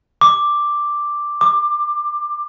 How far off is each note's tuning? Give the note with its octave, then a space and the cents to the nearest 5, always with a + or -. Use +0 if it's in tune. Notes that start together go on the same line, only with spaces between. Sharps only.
D6 +5
D6 +20